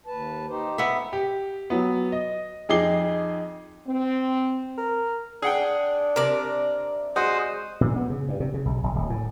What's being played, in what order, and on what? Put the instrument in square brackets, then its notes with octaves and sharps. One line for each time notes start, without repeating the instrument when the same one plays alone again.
[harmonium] D#2 B4 A5
D#4 G4 C5
[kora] B3 E5
[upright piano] G4
F#3 B3
D#5
F2 D#4 G#4 D6 C7 G7
[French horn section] C4
[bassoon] A#4
[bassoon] D4 [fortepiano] G#4 F#5 G5
[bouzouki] C3 D5 [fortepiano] A#4
[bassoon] G#3 [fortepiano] F#4 [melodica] C5 D#6
[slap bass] A#2
B3
C#3
G2
C3
C#3
B1
F#1
D1
A2